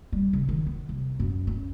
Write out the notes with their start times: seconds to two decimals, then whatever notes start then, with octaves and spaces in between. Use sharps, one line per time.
0.13 G3
0.33 C#3
0.49 D#3
0.66 B3
0.89 C2
1.20 F#2
1.47 C#4